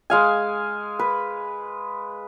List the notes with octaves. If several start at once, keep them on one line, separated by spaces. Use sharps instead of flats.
G#3 F5 G#5
B4